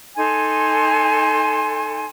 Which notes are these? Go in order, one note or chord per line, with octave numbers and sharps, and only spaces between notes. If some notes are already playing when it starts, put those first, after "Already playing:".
D#4 A4 G#5 C6